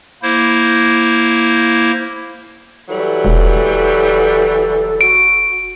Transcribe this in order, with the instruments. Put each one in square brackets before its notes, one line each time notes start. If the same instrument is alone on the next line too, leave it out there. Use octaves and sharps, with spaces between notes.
[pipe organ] A#3 E4 C5
[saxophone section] E3 F#3 G3 [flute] A4
[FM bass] E1
[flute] F#4 [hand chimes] D7